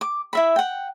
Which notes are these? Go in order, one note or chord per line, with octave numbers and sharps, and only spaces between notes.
D6
E4 E5 B5
F#5 G5